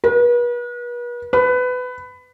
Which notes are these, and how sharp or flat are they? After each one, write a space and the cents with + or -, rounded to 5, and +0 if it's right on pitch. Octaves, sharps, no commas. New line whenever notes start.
B4 -40
B4 +20